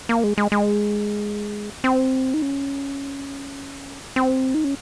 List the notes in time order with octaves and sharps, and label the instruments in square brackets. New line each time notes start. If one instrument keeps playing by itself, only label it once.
[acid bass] A#3
G#3
G#3
G#3
C4
D#4
C#4
C4
D#4
C#4